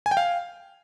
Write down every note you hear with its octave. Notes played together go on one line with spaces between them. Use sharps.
G#5
G5
F5